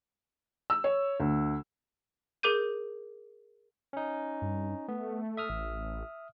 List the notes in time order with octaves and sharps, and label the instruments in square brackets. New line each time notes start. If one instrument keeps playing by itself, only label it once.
[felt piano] E6
C#5
D2
[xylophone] G#4 A#4 D6 G6 D#7
[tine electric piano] C#4 D#4
[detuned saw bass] G2
[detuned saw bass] A3 [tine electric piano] B3
[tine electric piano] E5 D#6 F6
[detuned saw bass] A1